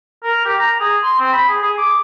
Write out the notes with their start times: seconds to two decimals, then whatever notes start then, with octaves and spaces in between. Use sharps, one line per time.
0.23 A#4
0.45 G4
0.59 A#5
0.80 G#4
1.04 C6
1.19 C4
1.33 B5
1.49 G#4
1.62 G#4
1.78 D6